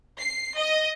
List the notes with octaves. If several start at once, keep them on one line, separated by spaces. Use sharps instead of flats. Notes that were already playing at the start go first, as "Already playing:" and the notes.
C7
D#5